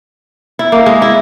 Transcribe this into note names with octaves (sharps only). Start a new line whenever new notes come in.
E4
A#3
G#3
E4